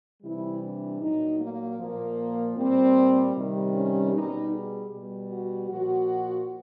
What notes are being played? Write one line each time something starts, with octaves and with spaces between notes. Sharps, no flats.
C3 E3 G3 E4
D4
A#2 F#3 D#4
A#3
A#2 F3 A#3
A#2 G3 C4
C3 D#3 G3
C#4
B2 G3 D#4
G#4
B2 G3
F#4
A#2 F3 F#4